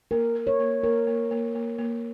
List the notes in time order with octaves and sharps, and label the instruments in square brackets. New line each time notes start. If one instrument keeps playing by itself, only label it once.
[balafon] A#3 [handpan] A#4
[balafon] A#4
[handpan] C#5
[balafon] A#3
[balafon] A#3 [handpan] A#4
[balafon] A#3
A#3
A#3
A#3